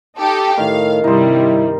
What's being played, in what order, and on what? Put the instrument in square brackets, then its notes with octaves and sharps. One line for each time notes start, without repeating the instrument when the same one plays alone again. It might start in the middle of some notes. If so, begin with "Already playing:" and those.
[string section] D#4 G4 A4
[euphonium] A2 [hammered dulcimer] D#3 [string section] F5
[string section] G2 C3 G3 [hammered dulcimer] D#4 C5 [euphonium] E4